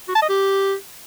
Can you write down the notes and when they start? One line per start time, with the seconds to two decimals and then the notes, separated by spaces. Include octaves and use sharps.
0.08 F#4
0.15 A5
0.22 D#5
0.29 G4